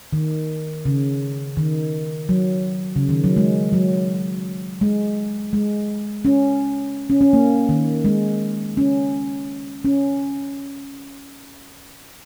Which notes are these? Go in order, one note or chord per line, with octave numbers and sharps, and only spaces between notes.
D#3
C#3
D#3
F#3
C#3
D#3
F#3
G#3
F#3
G#3
G#3
C#4
C#4
C#4
A#3
D#3
G#3
C#4
C#4